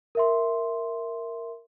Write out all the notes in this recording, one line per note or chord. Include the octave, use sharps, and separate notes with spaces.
A#4 E5 C6